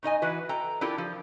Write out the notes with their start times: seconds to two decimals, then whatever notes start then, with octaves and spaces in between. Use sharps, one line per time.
0.03 A2 D#4 D#5 G#5
0.22 E3 F#4 B4
0.49 A4 G5 A#5
0.81 D4 E4 F4 G4 A4 A#4
0.98 F3